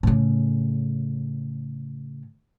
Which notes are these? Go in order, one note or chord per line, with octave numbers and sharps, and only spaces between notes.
A2 C#3